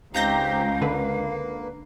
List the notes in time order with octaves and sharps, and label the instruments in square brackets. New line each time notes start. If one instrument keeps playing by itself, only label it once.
[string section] C#2 [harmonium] C4 D#4 G4 [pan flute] F5 [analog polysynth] A#5 G6 A#6
[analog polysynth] D3 B4 [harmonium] A#3